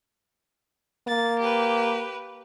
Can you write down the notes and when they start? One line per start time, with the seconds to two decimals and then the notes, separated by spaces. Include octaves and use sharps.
1.07 A#3 A6
1.40 G4 B4